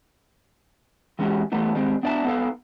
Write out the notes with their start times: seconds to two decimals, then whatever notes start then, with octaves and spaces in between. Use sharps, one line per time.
1.19 E3 G#3 C#4 D#4 F#4 G4
1.52 E3 G3 A3 B3 D#4
1.75 D#3 G3 G#3 C4
2.03 B3 D4 D5 E5 A5
2.25 B3 D#4 A4 B4 F5